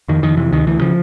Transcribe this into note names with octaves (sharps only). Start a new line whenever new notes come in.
F2 D#3
F2 D#3
C3 E3
D2 D#3
D2 E3
C#3 F3